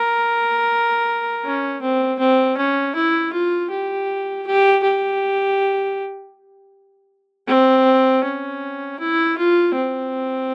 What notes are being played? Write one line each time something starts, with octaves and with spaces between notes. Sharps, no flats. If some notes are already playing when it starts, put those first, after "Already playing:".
Already playing: A#4
C#4
C4
C4
C#4
E4
F4
G4
G4
G4
C4
C#4
E4
F4
C4